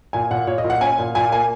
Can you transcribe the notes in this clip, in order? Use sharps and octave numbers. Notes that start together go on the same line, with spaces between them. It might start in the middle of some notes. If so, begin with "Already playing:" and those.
A#2 G#5
A#2 F#5
A#2 C#5
D#5
A#2
F#5
C#4 G#5
A#2
A#2 G#5
A#3 G#5